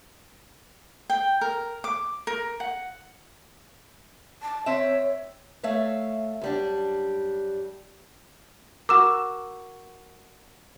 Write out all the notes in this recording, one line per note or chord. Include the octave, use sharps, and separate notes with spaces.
G5
A#4
D6
A#4
F#5
A5
C4 C#5 E5
A3 C#5 E5 F5
F#2 G3 D4
F#4 A#4 D6 E6 E7